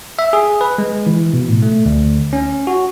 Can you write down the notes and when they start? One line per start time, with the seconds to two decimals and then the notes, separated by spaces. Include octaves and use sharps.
0.19 E5
0.33 G#4
0.61 B4
0.78 G#3
1.07 E3
1.33 B2
1.48 A2
1.62 A3
1.86 D2
2.33 C#4
2.67 F#4